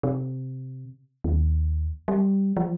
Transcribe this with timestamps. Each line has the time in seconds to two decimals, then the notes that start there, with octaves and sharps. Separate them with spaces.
0.03 C3
1.24 D#2
2.08 G3
2.57 F3